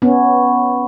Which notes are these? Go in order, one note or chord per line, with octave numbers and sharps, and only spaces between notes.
B3 C#4